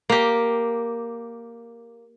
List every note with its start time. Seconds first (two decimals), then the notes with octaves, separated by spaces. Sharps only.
0.10 A#3 G4